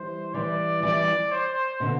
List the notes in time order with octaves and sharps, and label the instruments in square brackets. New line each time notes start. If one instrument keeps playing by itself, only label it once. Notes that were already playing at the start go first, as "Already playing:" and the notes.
Already playing: [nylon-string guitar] E3 G3 [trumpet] C5
[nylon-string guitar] E3 G3 [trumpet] D5
[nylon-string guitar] E3 G3 [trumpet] D5
[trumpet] C5
[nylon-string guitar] B2 D3